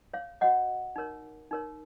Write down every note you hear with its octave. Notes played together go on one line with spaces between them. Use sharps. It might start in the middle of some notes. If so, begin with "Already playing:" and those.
C#5 F5
F#4 C#5 D#5 F#5
D#4 A#4 C#5
D#4 A#4 C#5